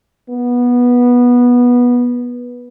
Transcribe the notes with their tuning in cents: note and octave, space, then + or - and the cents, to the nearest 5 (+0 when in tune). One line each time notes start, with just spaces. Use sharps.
B3 -15